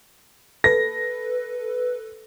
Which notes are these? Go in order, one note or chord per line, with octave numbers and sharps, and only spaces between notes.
A4 B4 A#6